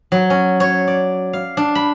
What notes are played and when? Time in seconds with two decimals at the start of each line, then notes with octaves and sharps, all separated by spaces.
0.12 F#3
0.30 C#4
0.60 C#5
0.88 D5
1.33 F5
1.57 D4
1.75 B5